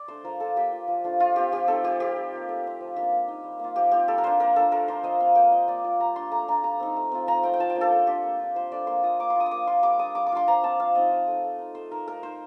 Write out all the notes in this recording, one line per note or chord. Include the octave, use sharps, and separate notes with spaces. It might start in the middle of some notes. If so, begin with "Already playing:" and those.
Already playing: D5
A3 D4 C5
F3 A#4
A3 D4 F4 A4
A#3 G4
F4
F3
A3 D4 F4
A3 F4
C4 F4 G4
F3 G4
A3 C4 D#4 A4
F3 G4
C4 F4 G4
G3
A#3 F4
A3
C4 D#4
F3
A#3 D4 G4
A#3
D#4
G3
A#3 F4
F3 G4
C4 F4 G4
G3 A4
A#4
D4 F4 C5
A#3 A#4
D4 F4 A4
A3 A#4
D4 F4 C5
F3 D#5
C4 F4 F5
A#3 G5
F4 D#5
A#3 D5
F4 D5
G3 A#5
D4 F4 C6
A3 A#5
D4 F4 A#5
G3 A#5
C4 D#4
A3
C4 F4
F3 A#5
A3 C4 G5
G5
F3 A5
G5
A#3 D4 F4
A4
A3
D4 F4 G4
A#3
D4 F4
F3 C5
A3 D4 F4 D5
A#3 C6
F4 D#6
A#3 D6
C6
D4 F4 D#6
D#6
A#3 D6
F4 C6
G3 D6
A#3 D4 D#6
G3 D6
D6
D4 F4 C6
F3 A#5
C4 F4 A5
F3 F5
C4 D#4 D#5
F3
A3 D#4
A3
D#4
A3 C5
D#4 A#4
A3 A#4
D#4 C5